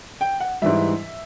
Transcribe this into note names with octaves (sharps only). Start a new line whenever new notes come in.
G5
F#5
G#2 E3 G3 E5